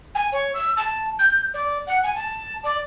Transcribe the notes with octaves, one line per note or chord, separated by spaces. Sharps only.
G#5
C#5
E6
A5
G6
D5
F#5
G#5
A5
D5